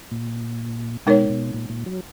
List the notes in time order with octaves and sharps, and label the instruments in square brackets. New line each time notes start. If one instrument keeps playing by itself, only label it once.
[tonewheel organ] A#2
[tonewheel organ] B2 [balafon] G#3 D#4 A#4 C#5
[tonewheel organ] B2
A#2
A#2
F#3